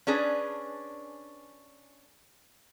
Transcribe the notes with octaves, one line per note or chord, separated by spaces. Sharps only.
C#4 D4 G#4 B4